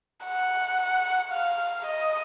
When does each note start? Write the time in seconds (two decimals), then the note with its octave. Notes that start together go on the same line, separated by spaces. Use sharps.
0.25 F#5
1.32 F5
1.86 D#5